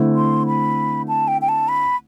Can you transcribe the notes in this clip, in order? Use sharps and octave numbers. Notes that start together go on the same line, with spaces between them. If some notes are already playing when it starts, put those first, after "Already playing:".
Already playing: D3 A3 C4 E4
C6
B5
A5
G5
G5
A5
B5